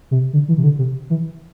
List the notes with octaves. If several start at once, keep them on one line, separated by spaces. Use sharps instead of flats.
C3
D3
E3
C3
D3
C3
E3